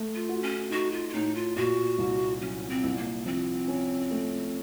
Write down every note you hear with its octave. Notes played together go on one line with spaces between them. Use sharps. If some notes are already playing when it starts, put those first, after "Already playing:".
Already playing: A3
F4
F#4
C#4
D#4 F#4
F4
F4
A2 D#4
F4
A#2 F#4
C2
F#3 C#4
C4
C2
A#3
F3 C4
C#4
A3